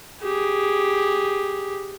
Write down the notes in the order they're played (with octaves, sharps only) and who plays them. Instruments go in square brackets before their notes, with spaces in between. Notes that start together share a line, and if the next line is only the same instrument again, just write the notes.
[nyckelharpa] G4 G#4